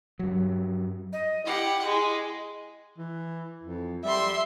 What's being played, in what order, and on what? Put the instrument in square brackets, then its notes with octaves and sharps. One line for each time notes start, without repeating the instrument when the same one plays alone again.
[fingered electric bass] G2 F#3
[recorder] D#5
[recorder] E4 [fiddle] G4 F#5
[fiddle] G#3
[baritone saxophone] E3
F2
[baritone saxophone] G3 [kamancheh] E5 C6